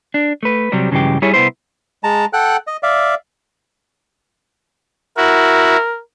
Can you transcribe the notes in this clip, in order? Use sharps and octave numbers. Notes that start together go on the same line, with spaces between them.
D4
A3 B4
C3 F#3 G3 C4
G2 C#3 E3 F#3 G#3 G4
G3 E4 G#4 C#5
C2 B3 E4 C5
G#3 A5 A#5
A4 F#5 G5 F#6
D#5
D5 E5 F5
E4 F#4 A#4